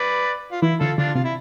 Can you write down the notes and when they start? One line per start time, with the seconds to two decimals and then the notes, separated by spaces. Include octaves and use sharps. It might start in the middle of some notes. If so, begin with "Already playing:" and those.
Already playing: B4 D5
0.52 F4
0.62 E3 E4
0.80 D3 F4 A4
0.98 D3 D4 F4
1.15 C3 F4
1.24 E4